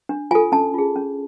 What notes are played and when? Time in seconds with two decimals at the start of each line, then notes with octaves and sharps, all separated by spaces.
0.09 D4
0.31 F4 A4 G#5
0.52 C#4 A5
0.74 F4 G#4
0.96 C#4